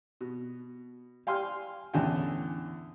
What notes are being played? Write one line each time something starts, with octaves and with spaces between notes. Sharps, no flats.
B2
F5 G5 G#5 C6 F6
E2 A2 D3 C#4 G5 G#5